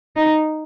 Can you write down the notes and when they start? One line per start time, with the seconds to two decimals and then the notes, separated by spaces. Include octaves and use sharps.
0.17 D#4